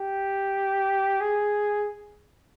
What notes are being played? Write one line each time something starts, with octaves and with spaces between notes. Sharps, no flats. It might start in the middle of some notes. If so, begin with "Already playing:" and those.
Already playing: G4
G#4